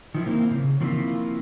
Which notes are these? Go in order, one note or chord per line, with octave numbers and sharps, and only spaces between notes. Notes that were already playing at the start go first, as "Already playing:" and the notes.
D#3 F3 E4
A#3 C4 E4
A#2 C#3
D#3 F3 A#3 C4 E4 F4